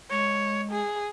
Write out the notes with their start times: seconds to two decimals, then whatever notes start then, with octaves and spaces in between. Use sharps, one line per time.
0.10 G#3 C#5
0.71 G#4